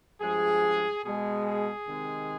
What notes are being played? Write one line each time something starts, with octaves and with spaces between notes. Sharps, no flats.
G2 F3 G#3 G#4
B2 G#3 G#4
G#4
C3 D#3 G#3